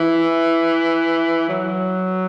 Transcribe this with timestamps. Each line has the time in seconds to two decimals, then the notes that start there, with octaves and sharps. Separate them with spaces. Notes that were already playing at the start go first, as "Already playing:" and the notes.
Already playing: E3
1.49 F#3